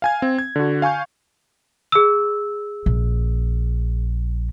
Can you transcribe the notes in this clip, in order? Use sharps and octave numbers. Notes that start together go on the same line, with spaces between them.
F5 G#5 G#6
C4
G#6
D3 F#4
F5 G#5 C#6 G6
G#4 E6
A#1